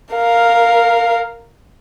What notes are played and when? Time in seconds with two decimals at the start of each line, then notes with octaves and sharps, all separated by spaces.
0.14 A#4 F5